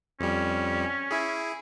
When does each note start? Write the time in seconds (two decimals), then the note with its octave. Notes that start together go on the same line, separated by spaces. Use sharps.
0.20 F2 G3 C#4
1.11 E4 G#4